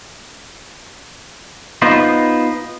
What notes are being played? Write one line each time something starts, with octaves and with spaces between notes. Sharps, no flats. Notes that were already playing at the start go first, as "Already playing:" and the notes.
B3 D#4 F4 C5